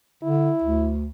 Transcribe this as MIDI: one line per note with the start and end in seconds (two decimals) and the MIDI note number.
0.23 0.51 50
0.23 0.91 64
0.64 1.09 38